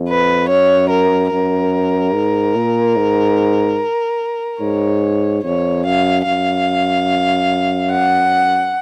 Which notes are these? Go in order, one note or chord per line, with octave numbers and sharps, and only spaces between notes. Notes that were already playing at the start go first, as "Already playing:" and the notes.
Already playing: F2
B4
F#2 C#5
A#4
F#2 A#4
G#2
A#2
G#2
G#2 C#5
F2 C#5
F#2 F5
F#2 F5
F#5